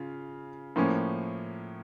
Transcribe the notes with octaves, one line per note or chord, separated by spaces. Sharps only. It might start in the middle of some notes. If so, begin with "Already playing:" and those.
Already playing: C#3 F4
A2 F3 A#3 C#4